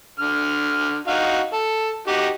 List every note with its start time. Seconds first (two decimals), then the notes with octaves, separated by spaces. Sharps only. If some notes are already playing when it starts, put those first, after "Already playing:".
0.19 D3 F6
1.08 D#4 F#4 F5
1.53 A4
2.08 D#4 F#4 G4